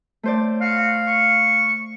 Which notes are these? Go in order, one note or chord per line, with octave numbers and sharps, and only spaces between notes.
A3 C5 D5
F#4 F5
C#6